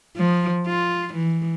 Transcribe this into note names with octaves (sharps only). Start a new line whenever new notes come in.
F3
F4
E3